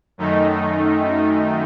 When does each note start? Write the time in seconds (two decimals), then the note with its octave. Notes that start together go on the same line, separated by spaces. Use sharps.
0.18 F#2 D#3 A3 D#4